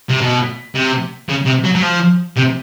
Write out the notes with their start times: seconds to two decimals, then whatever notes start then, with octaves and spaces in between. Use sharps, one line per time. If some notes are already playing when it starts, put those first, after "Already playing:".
0.09 C3
0.21 B2
0.75 C3
1.29 C#3
1.46 C3
1.64 F#3
1.75 F#3
1.82 F3
2.37 C3